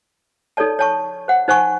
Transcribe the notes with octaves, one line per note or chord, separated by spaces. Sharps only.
D#4 A4 C#5 D5 A5
C#5 A5 C#6
C5 F#5
D#4 C5 F#5 G#5 C#6